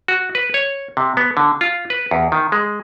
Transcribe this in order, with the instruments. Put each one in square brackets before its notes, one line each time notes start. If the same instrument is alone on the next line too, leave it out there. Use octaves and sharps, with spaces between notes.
[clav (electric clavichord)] F#4
B4
C#5
C3
B3
D3
F4
B4
E2
D#3
G#3